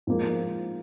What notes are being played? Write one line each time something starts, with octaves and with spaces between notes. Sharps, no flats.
G#2 F3 A#3